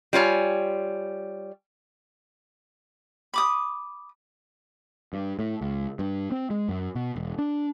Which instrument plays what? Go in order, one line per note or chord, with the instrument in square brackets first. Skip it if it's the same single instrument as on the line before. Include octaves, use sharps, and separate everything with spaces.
[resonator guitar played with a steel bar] G3 F4 C#5 G#5
[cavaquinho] B5 D6 D#6
[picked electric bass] G2
A2
C#2
G2
C4
G#3
F#2
B2
E1
D4